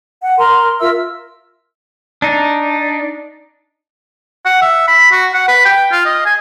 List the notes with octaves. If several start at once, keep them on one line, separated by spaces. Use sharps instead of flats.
F#5
A#4 A#5 C6
F4 A#4 E5 E6
D4 D#4
F#5
E5
B5
F#4
F#5
B4
G5
F4
D#5
G#5